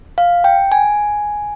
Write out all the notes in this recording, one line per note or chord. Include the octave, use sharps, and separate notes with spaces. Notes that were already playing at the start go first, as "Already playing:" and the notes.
F5
G5
G#5